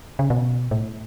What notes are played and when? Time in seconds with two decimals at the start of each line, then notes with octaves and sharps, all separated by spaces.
0.19 C#3
0.30 B2
0.71 A2